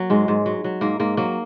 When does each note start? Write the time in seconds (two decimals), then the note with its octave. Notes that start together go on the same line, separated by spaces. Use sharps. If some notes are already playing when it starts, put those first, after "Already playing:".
Already playing: F#3 A#3
0.10 G#2 G#3
0.28 G#2
0.46 F#3
0.64 F#3
0.81 G#2 A#3
1.00 G#2 A#3
1.17 F#3 A#3